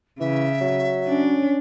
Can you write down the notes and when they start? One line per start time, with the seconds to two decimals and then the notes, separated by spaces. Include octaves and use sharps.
0.20 C#3 E3 E5
0.61 F#3
1.08 C#4 D4